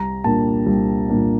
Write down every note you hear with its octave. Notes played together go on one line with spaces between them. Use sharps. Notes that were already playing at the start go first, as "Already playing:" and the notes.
Already playing: C2 A#5
A#2 G3 A#3 D4 A5
C2
A#2 G3 A#3 D4